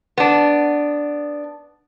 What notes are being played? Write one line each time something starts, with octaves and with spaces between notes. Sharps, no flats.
B3 D4